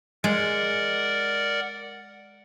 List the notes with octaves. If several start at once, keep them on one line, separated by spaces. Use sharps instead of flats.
G#3 A#4 D5 F#5